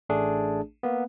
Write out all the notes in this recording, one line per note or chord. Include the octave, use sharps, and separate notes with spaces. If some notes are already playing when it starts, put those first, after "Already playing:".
A1 A3 D4 G#4
A#3 B3